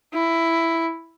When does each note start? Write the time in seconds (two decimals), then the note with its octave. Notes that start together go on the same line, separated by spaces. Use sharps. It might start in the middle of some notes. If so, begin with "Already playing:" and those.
0.14 E4